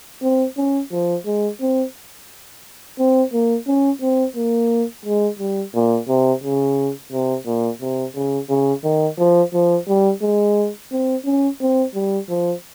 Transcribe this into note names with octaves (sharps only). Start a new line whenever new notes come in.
C4
C#4
F3
G#3
C4
C4
A#3
C#4
C4
A#3
G#3
G3
A#2
C3
C#3
C3
A#2
C3
C#3
C#3
D#3
F3
F3
G3
G#3
C4
C#4
C4
G3
F3